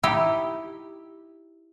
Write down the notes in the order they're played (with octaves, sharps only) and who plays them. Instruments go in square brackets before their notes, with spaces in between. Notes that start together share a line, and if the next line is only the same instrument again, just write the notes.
[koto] D#4 E4 G4